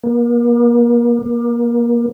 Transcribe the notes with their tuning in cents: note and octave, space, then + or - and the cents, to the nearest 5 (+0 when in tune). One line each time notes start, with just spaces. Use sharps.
A#3 +35
A#3 +25